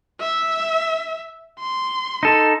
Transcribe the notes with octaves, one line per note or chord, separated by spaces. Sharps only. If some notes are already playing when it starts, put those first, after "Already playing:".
E5
C6
D#4 A4